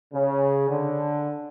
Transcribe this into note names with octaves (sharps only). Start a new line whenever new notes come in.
C#3
D3